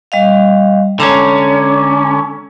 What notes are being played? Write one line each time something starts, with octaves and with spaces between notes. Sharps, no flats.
G3 D#5 F5
D3 G#3 C#4 A#5